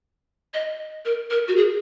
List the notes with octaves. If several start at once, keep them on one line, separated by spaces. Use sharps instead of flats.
D#5
A#4
A#4
F#4
G#4